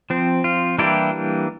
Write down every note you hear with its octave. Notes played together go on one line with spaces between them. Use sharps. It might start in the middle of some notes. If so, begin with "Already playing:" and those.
F3 C4
F4
E3 G3 A#3 D4 E4 G4